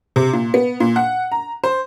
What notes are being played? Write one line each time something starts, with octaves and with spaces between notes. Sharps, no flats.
C3
A#2
B3
A#2
F#5
A#5
C5